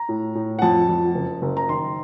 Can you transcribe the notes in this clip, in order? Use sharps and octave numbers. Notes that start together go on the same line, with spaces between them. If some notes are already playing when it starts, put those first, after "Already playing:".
Already playing: A#5
A2
A2
F#5
F2 A5
F2
F#1
F#1
A#5
D#3 C6